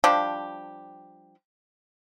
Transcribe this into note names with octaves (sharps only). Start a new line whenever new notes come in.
F3 G3 D4 G4